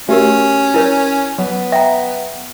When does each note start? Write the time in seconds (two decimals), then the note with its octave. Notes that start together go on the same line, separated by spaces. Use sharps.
0.09 A3 C#4 F#4 G4 A#4
0.74 E4 A#4 C#5
1.38 F#3 B3
1.72 E5 G5 A#5